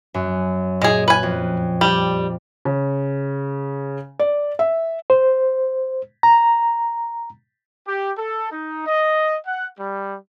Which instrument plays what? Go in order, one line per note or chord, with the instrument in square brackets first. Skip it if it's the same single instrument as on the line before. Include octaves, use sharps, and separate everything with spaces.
[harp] F#2
[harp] A#2 [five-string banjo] G#3 G#4
[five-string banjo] B4 G#5
[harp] F2
[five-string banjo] G3 [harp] D5
[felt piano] C#3
D5
E5
[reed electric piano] C5
A#5
[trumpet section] G4
A4
D#4
D#5
F#5
G3